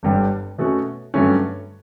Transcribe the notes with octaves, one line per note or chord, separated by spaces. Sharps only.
G1 G2 D3 G3
B2 A3 C#4 F#4
G2 D3 F#3 A3 C#4